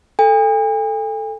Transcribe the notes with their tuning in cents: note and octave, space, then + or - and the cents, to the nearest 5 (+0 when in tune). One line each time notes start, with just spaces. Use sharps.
A4 +0 G#5 -45